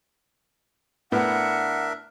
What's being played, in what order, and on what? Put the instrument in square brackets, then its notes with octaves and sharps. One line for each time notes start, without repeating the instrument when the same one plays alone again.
[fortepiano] A2 B3 [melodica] D4 A#4 E5 [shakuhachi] F#5